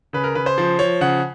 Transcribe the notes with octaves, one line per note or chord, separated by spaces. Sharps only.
C#3 B4
A#4
C#3 B4
C5
F3
F3 C#5
C#3 F#5